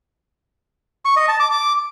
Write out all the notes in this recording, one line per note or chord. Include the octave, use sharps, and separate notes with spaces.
C#6
D#5
A5
D6
D6